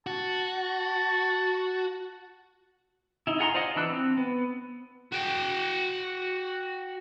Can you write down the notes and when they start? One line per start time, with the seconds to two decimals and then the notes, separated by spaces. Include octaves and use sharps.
0.07 F#4 A5
3.27 D#4 E4
3.39 F4 G#4 F#5 A#5 C6
3.54 F4 C5 D5 D#5 F#5
3.76 E3 D4 E4 E6 F#6
3.89 C4
4.17 B3
5.12 F#4 G5